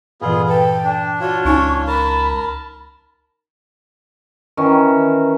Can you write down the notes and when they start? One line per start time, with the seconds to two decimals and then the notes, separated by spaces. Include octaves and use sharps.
0.22 G2 A#2 E3 B3 F4 G#4
0.49 A4 B4 G5
0.85 D4
1.21 D4 F4 F#4 C#5
1.45 C#2 C#4 D#4 G#5 C#6
1.88 A#4 A5 B5
4.57 D#3 E3 C#4